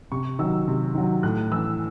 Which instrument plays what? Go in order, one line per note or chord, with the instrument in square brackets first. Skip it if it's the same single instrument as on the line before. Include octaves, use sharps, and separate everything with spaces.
[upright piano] C3 C#6
D#3 F#3 E6
C3
D#3 F#3
A2 F#6
E3 E6